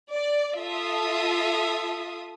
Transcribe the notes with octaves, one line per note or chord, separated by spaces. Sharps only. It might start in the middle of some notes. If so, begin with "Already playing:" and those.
D5
F4 A4 E5 D#6